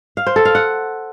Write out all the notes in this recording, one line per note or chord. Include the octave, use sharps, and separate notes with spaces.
F5
C5
A4
F5
F#5